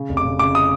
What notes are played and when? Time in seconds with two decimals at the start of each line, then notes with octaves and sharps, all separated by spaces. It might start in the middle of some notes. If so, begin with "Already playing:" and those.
Already playing: C#3
0.09 F1
0.17 D6
0.25 C#3
0.39 C#3 D6
0.55 D#6